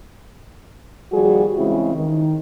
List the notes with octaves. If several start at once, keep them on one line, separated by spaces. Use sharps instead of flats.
D#2 F3 G3 F#4 G#4
C#3 E3 G#3 C4 E4
D#3